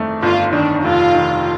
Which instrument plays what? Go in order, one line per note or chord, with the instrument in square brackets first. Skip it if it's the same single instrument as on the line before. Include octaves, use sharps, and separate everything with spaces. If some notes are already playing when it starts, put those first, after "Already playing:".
Already playing: [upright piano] G1 F2 D#3 A3
[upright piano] G1 [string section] F4
[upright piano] D#3 [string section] D4
[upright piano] F1 [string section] F4
[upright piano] D#3